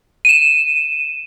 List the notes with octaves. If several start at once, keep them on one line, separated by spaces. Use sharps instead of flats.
D#7 E7